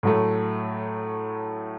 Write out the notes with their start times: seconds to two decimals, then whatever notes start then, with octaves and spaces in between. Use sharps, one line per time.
0.03 A2 F#3 A3